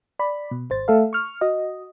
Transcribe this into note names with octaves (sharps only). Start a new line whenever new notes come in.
D5 B5
B2
G#1 C5 A6
A3 A4 E5 F5
C#6 F6
F#4 D#5